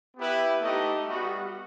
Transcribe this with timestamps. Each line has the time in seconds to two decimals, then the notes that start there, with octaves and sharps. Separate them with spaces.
0.17 B3 E4 G4 B4
0.61 A3 D#4 G4 D#5
1.06 G3 B3 F#4